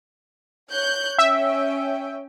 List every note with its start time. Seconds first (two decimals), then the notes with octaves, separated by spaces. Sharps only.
0.71 C#5 F#6 G6
1.18 C#4 E5 G5